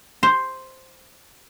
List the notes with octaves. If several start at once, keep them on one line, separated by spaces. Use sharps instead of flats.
C5